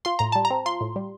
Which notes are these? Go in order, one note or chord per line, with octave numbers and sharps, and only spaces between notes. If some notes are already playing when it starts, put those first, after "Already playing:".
F4 C6
A2 A#5
G3 A5
A#5
C4
F4 C6
A2
G3